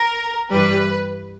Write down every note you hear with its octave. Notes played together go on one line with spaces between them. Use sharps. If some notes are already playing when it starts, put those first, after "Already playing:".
Already playing: A#4
G2 E3 G3 B4